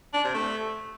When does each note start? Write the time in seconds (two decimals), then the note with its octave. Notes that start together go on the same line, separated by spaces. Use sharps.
0.13 D4
0.24 C3
0.34 A3